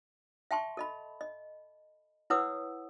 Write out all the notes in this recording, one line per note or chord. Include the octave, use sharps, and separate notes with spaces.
E5 G5 A5 C6 C#6
A4 D#5 B5
D#5
E4 B4 C#5 F#5 D#6 E6